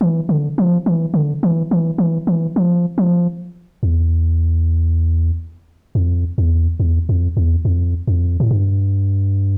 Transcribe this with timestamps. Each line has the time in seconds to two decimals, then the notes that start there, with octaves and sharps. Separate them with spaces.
0.01 E3
0.29 D3
0.58 F3
0.86 E3
1.14 D3
1.43 E3
1.71 E3
1.98 E3
2.27 E3
2.56 F3
2.98 F3
3.83 E2
5.95 F2
6.38 E2
6.80 E2
7.09 F2
7.37 E2
7.65 F2
8.07 F2
8.40 A2
8.51 G2